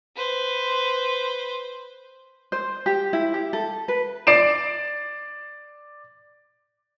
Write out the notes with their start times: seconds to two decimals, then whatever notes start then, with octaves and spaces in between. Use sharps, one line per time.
0.16 B4 C5
2.52 C5
2.86 G4
3.13 E4
3.34 G4
3.53 A4
3.88 B4
4.27 D5 C7 D7 E7